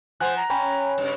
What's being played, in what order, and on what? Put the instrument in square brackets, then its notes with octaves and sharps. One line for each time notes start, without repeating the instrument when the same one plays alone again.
[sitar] F3 [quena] C5 [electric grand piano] F#5 G#5 F#6
[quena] A#5
[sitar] C#4 [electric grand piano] G5 G#5 B5
[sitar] G2 C#3